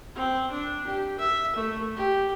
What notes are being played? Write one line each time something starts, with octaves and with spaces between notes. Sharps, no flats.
C4
D4
G4
E5
A3
G4